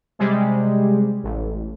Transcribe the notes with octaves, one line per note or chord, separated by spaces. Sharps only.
C3 G3 G#3
A1